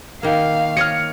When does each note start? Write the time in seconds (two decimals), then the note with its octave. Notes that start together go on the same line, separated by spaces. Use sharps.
0.23 D#3 A#3 F5
0.77 C#5 D#5 F6 C#7